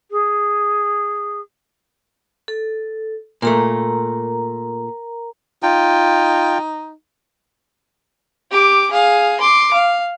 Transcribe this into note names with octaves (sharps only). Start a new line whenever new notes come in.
G#4
A4
A#2 A3 A#4 A#5
D#4 F4 G5
G4 D6
G#4 F5
C6 D6
F5